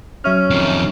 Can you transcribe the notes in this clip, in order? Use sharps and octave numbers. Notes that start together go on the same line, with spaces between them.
F#3 C#4 E5 F6
F2 D#3